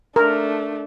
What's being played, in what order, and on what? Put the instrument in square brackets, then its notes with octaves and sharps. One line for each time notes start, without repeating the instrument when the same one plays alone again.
[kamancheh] A3 D4 [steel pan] A#4